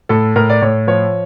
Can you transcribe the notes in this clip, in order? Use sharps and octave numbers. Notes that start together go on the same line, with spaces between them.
A2 A4
A2 A#4
D5
A2 C#5
F3 C#5